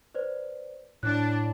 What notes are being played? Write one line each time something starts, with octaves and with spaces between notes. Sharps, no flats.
B4 C5 D5
A2 D4 F#6